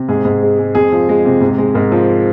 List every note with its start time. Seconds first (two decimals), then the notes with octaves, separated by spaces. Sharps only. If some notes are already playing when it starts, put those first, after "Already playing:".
Already playing: C3
0.09 G#2 G#4
0.25 G#2
0.42 G#3
0.59 G#3
0.75 F2 G#4
0.92 F3
1.09 G#3
1.25 C3
1.41 G#2
1.58 G#3
1.74 G#2 A#4
1.92 F3